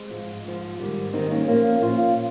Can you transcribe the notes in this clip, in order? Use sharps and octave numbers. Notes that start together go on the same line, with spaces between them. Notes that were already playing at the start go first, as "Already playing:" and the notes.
Already playing: G#3 C4
G#2 F3
G#2 F3
G#2 D#3 G3
G#2 D#3 G3 C4 D#4
A#3 C#4
A#2 F3 A#3 C#4
A#2 F3 C#4 F4